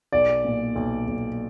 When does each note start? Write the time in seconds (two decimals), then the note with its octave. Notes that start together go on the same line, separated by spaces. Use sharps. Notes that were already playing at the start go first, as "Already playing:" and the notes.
0.12 B1 D5
0.44 A#2
0.75 B1
1.07 B1